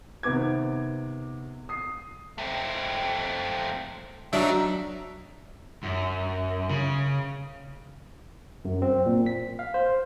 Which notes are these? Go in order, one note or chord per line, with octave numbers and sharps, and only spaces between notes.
C3 D#3 B3 D6 G#6
D#6 C7
A3 C4
D#3 F#3 D4 D#4 E5
F#2
C#3
F#2
C4
A#2
B6
F5
C5